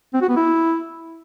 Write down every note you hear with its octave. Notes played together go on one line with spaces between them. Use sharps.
C4
F#4
B3
E4